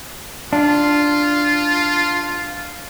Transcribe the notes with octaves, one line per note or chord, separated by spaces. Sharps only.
D4 F4